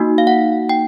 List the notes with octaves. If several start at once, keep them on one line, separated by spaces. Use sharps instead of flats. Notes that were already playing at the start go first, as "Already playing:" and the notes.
Already playing: A#3 D#4 F#4
F5
F#5
G5